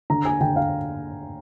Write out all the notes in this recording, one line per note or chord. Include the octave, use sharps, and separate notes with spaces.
D3 A#5
G#5
D3 G5
F5